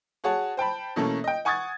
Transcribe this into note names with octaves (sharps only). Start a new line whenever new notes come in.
F#4 G#4 C#5 F#5 A5
C5 G5 A5 B5
B2 E3 A3 A#3 C#4 A4
D#5 G5
F#5 G#5 C#6 D#6 G#6 A6